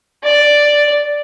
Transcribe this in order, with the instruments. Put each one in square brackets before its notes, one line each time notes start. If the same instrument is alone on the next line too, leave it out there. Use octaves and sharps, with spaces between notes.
[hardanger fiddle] D5